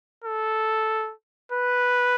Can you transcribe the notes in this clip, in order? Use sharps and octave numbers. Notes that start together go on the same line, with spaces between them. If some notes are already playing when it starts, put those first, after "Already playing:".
A4
B4